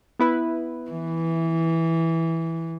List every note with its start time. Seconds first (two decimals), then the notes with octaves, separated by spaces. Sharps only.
0.19 B3 E4 B4
0.91 E3